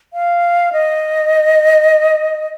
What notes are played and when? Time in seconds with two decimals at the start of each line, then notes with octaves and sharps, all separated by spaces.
0.14 F5
0.73 D#5